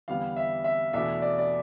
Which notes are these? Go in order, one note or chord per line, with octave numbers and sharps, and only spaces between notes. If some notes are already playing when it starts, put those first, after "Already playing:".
E2 D3 G3 B3 F5
E5
E5
E2 B2 A3 D4 E5
D5
D5